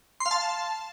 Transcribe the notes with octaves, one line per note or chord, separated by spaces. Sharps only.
C6
F5
A5